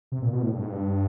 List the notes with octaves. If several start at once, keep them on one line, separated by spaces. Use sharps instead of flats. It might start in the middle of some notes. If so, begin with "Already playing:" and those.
C3
A#2
B2
A2
G2
G#2
G2